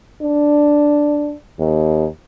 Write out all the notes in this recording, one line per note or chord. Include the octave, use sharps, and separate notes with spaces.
D4
D#2